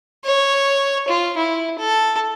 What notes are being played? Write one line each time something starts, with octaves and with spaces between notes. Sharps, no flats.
C#5
F4
E4
A4